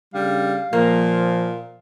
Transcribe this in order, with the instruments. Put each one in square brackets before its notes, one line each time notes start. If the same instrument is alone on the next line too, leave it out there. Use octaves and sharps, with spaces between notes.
[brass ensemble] C#3 A3 D4 [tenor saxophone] G3 [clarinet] F5
[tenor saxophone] A#2 [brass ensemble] F3 [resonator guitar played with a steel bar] A#3